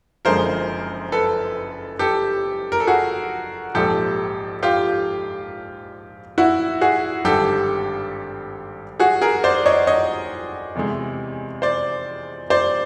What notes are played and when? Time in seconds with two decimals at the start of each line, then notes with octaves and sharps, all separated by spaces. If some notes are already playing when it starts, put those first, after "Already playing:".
0.25 F#1 F#2 D3 F3 G#3 A#4 C5
1.12 A4 B4
1.99 G4 A4
2.72 A#4
2.80 A4
2.87 F#4 G#4
3.75 A#1 G#2 F3 G4 A4
4.63 F4 G4
6.38 E4 F#4
6.81 F#4 G#4
7.24 G#1 G2 D3 G4 A4
9.00 F#4 G#4
9.22 G#4 A#4
9.44 C5 D5
9.66 C#5 D#5
9.87 C#5 D#5
10.75 E2 C3 E3 G#3
11.62 C5 D5
12.50 C5 D5